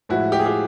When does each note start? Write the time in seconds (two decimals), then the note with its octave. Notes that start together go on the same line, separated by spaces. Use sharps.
0.09 A2 F3 G#3 E4 F#4
0.32 G4
0.39 G#4
0.46 F4 G4